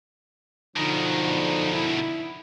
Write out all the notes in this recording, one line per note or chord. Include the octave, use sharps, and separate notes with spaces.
B2 D3 D#3 F3 D#4
E4